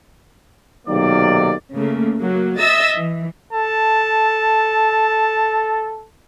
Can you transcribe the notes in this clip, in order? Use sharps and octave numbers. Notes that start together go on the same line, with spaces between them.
B1 C3 D#3 F#3 A#3 D5
C#3 A3 A#3
F#3 A#3
D#5 E5 E6 A6
E3
A4 A5